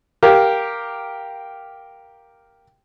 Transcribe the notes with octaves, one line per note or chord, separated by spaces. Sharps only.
G4 A#4 F5